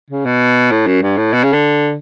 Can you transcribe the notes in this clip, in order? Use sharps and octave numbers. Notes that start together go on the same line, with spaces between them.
C#3
B2
A2
F#2
G2
A2
B2
C#3
D3